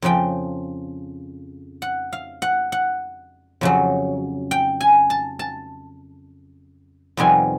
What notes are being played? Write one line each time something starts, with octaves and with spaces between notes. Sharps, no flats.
F2 C#3 F3 G5
F#5
F5
F#5
F#5
F2 C#3 F#3
G5
G#5
A5
A5
F2 C3 D#3 G3 B3 G#5